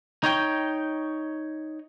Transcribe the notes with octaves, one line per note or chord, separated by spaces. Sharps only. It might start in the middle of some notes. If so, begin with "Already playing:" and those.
D#4 C#5 G5